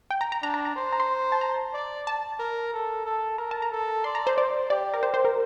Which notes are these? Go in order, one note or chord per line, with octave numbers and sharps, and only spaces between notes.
G5
A#5
A#5
D4 A#5
A#5
A#5
C5
A#5
C6
A5
A#5
D5
A5
A#4
A4
A4
A#4 A#5
A5
A#5
A4
D5 C6
A#5
C5
C5 D5
G4 D5
A#4
C5
C5
A#4